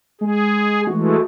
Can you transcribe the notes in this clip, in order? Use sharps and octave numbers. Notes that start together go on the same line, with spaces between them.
G#3 G#4
E3 G#3 A3 F#4